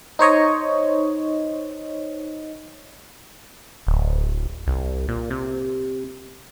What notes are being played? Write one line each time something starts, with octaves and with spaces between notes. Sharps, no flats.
D#4 C5 C#5 D#5
D1
C2
A#2
C3